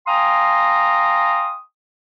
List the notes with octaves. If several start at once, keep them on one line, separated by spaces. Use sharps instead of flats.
F5 G5 G#5 A#5 C6 D#6